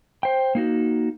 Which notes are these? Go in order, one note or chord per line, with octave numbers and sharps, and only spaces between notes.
C5 G5
A#3 D#4 F#4